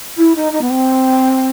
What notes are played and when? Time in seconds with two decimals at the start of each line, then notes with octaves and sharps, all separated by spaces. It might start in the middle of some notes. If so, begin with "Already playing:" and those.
0.17 E4
0.35 D#4
0.51 D#4
0.61 B3
0.69 C4